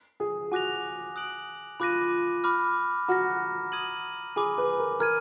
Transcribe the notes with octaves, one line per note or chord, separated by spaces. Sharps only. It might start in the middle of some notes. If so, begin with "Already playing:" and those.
G#4
F#4 G#5 D6 F#6 A#6 F7
D#6 F#6 D7 F#7
F4 B5 D6 F#6 A#6 D#7
B5 D6 F6
F#4 A#5 F6 A#6
D#6 G#6 D#7 F#7
G#4 G#5 B5 D6
B4
A#4
A#4 F6 G#6 D#7